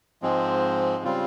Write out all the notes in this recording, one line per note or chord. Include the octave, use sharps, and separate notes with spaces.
G#2 F3 G#3 C4
C#3 G3 C4 F4